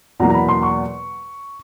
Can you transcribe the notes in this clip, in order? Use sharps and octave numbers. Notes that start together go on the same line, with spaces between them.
E2 B2 F#3 A#3 A#5
A#5
B5
C6
C#6